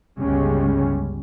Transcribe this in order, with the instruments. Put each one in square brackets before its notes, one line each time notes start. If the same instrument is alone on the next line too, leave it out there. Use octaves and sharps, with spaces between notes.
[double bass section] G1 C#2 C#3 G3 G#3 C#4